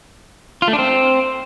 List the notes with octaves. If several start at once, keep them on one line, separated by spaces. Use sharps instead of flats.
F4
A3
D4
C4